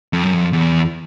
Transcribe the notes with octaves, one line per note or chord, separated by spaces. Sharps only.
F2
F#2
F2
E2